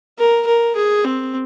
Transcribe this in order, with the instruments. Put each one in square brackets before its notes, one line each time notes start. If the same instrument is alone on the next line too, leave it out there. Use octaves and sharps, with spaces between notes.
[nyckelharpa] A#4
A#4
G#4
C4